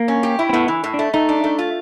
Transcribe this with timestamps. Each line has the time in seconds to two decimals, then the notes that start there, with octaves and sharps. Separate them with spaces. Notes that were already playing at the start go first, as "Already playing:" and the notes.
Already playing: A#3
0.08 C#4
0.23 G4
0.39 E4
0.49 C4
0.53 A2 B3
0.68 E3
0.84 A2
0.94 D4
0.99 A3
1.13 A3 D#4
1.29 D4
1.44 A3
1.59 F4